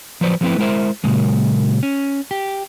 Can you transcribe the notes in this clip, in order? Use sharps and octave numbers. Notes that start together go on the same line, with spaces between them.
F3 F#3 B4 C5 D5
F3 F#3 A3 C4 E4 B4
G#3 E4 A#4 C5 E5
A#2 C#3 F#3 G#3 A#3
C#4
G4